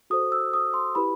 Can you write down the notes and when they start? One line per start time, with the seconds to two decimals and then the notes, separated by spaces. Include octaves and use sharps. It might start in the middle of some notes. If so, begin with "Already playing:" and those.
0.10 F#4 A4 C5 D#6
0.32 E6
0.53 D#6
0.74 C6
0.95 E4 G4 B4 B5